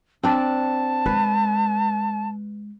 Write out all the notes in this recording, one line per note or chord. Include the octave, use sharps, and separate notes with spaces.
C4 D4 A5
G#3 B4